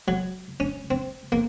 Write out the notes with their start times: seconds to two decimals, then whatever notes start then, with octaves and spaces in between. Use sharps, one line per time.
0.08 F#3
0.60 C#4
0.91 C4
1.32 A#3